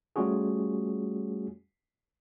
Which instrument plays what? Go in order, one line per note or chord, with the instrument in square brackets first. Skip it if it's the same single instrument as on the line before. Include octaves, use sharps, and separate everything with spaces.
[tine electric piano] G3 A3 C#4 F4 F#4 G#4